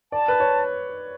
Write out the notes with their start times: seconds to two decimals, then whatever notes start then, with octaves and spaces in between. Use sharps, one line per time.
0.12 D5 A5
0.28 B4
0.40 C#5